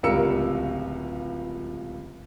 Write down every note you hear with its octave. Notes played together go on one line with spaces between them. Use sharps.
D1 C#2 G3 A#4 E6 C#7